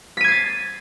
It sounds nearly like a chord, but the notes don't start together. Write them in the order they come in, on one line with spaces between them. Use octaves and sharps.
B6 D#7 G#6 C7 A6